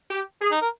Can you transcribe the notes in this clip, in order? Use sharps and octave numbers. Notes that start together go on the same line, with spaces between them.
G4
G#4
D#4
A#4